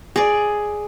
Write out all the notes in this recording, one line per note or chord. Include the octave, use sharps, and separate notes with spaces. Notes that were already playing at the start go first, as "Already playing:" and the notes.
G#4 D5